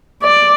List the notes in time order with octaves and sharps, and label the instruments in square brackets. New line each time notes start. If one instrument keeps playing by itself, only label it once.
[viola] D5